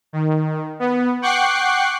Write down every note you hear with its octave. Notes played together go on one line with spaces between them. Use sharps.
D#3
B3
F#5 G5 C#6 D6 F#6 C7